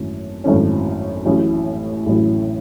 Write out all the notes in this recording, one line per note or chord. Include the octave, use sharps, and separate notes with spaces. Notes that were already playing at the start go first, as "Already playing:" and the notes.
Already playing: G#1 F#2 E3 A3 C#4
G#1 F#2 E3 A3 C#4
A1 A2 F#3 C#4 E4
A1 A2 F#3 C#4 E4